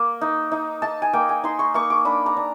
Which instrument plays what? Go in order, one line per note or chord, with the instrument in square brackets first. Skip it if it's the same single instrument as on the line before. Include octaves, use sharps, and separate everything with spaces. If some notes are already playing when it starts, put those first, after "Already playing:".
Already playing: [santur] A#3
D#4
D#4
D#4 A5
G#5
A#3 G5
G#5
D#4 C6
C#6
A#3 C#6
D6
D4 B5
A#5
D4